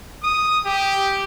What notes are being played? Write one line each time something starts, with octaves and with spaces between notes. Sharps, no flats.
D#6
G4